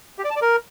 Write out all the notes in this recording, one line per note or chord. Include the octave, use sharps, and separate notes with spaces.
G4
D5
A5
D5
A#4